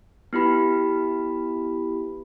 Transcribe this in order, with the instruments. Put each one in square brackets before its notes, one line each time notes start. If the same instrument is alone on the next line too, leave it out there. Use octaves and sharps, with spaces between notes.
[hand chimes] B3 E4 G4 B5